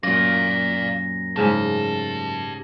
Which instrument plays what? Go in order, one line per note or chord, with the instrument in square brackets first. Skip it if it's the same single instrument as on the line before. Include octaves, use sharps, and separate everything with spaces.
[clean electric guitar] F#2 A#2 [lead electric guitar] D5 F5 [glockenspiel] A#6
[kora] G#2 C#3 A3 [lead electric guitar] G4 A5